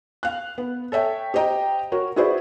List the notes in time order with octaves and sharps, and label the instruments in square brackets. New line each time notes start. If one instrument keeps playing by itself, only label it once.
[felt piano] F5 F#6
B3
A4 C#5 E5 G5
G4 C5 D#5 G5 A#5
F#4 A#4 C#5
E4 F#4 G#4 B4 C5 D5